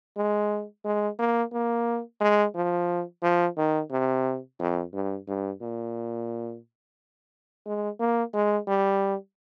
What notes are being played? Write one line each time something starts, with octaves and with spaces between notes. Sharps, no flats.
G#3
G#3
A#3
A#3
G#3
F3
F3
D#3
C3
F2
G2
G2
A#2
G#3
A#3
G#3
G3